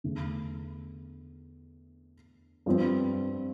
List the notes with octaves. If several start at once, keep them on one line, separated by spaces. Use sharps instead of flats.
E2 D3 A3
G2 F3 C4